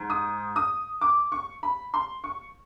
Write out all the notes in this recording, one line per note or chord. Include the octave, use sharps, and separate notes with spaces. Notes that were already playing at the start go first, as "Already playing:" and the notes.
Already playing: G#2
D#6
D#6
D6
C#6
B5
C6
C#6